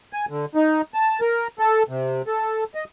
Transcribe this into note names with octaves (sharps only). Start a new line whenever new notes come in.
G#5
D3
D#4
A5
A#4
A4
C3
A4
D#5